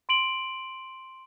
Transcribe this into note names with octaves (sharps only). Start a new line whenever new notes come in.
C6 D7 F#7